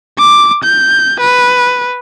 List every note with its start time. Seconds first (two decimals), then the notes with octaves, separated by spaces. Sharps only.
0.19 D6
0.64 G6
1.21 B4